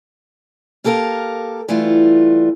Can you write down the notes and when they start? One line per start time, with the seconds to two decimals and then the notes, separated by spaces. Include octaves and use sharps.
0.84 A#3 G4 A4 A#4 F5
1.68 E3 G3 A3 F4